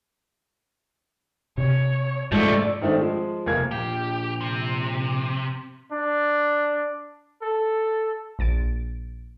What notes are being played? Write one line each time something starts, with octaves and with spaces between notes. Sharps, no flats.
C3 C#5
G#2 F3 G#3 A3 D5
G#2 D#3 A3 C4 D4
F3 G#3
F1 A#3 G#6
A#2 F3 G4
C3
D4
A4
A#1 A6 D7